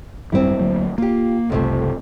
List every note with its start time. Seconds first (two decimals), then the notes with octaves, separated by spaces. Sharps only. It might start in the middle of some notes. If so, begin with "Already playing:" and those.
0.32 G#1 F#2 G3 C4 E4
0.60 D2 F#3 A#3
0.98 A#3 F4 G4
1.50 F#1 C2 F2 C3 A3